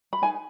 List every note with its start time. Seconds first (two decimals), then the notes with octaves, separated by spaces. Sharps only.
0.13 B5
0.22 D#4 G#4 B4 G#5